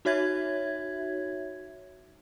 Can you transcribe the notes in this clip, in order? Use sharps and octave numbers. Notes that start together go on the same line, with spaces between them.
D#4 F#4 C#5 E5 G#6